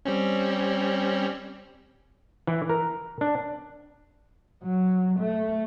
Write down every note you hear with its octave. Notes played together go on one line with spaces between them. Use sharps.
G3 C4 C#4
E3
A#4
D4
F#3
A3